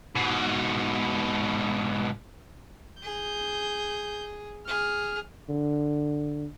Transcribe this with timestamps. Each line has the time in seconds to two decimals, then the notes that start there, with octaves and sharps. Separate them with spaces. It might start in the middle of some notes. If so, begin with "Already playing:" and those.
0.16 G#2 B2
3.03 G#4 G6
4.67 G#4 F6
5.49 D3